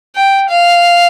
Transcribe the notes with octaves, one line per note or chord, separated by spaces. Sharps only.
G5
F5